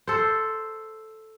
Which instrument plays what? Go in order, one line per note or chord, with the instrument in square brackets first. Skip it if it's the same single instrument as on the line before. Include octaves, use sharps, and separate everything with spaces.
[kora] A4 C5